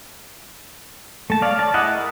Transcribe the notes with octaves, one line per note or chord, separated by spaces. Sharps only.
A3 A5
C#5 D5 F5
D5 A5
E4 G#4 D#5 F#5
A#4